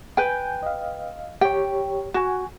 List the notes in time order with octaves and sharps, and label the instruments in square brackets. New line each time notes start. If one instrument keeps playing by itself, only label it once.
[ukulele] B4 G5 [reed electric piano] G#5 G6
[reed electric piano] D#5 F5
[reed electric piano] G4 C#5 [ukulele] G5
[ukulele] F#4 [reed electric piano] F#5 G#5